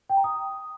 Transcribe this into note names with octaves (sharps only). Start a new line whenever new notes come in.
G5
A#5
D#6